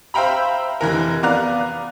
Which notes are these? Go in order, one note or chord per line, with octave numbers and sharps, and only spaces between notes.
C5 E5 F5 G5 A#5 B5
F1 E3 A#4
B3 D5 F5 A#5 F#6